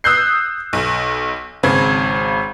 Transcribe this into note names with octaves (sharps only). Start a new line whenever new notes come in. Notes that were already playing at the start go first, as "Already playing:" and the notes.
D#6 E6 F#6 G6 C7
B1
G#1 C#3 C4 G#6